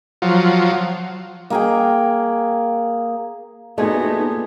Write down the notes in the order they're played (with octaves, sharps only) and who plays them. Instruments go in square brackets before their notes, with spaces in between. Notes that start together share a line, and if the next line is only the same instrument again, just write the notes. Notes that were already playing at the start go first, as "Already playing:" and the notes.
[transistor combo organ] F3 F#3
[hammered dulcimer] A#3 G#4 G5
[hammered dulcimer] A#2 G#5 [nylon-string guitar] A3 [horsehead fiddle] B3 D#4 [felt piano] F#4 G#4 D#5